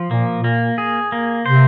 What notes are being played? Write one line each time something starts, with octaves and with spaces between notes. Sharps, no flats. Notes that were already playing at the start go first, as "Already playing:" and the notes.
Already playing: F3
A#2 A#3
A#2
A#3
G#4
A#3
C3 C5